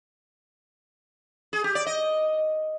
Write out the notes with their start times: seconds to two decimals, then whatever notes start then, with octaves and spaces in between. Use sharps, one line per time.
1.53 G#4
1.64 G4
1.75 D5
1.86 D#5